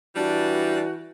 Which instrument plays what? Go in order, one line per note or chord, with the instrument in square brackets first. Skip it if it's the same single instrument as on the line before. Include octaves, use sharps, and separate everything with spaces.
[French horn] E3 [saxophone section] G3 D4 [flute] F#4